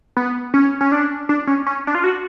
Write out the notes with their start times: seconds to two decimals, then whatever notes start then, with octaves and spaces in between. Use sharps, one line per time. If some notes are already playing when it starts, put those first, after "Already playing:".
0.17 B3
0.54 C#4
0.81 C#4
0.92 D4
1.29 D4
1.47 C#4
1.67 C#4
1.87 D4
1.95 F4
2.04 F#4